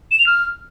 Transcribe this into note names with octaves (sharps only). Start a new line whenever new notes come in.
E7
F7
F6